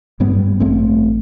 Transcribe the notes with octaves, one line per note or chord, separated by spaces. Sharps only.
G2 G3 B3
A1 A3 C4